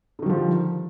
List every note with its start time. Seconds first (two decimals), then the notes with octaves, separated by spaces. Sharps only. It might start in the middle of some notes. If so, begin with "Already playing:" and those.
0.19 D3
0.22 D#3
0.26 G3
0.29 F3